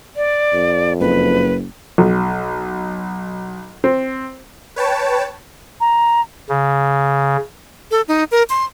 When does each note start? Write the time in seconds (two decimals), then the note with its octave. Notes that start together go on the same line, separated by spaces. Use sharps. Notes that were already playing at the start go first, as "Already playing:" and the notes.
0.16 D5
0.54 F2
1.00 F#1 B4
1.98 B1
3.84 C4
4.76 B4 C#5 G5 A5
5.80 A#5
6.49 C#3
7.91 A4
8.08 D#4
8.31 A#4
8.50 C6